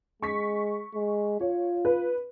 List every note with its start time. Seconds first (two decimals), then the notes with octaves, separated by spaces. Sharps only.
0.22 G#3 C#6 B6
0.95 G#3
1.41 F4 C#5
1.85 B4